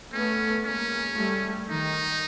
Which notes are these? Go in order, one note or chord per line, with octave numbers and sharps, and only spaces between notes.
A3 B3 C#4
G#3 A#3 C#4
G3 A3
D#3 D#4